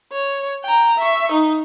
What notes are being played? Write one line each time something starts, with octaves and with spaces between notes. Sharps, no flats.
C#5
G5 A#5
E5 C#6
D#4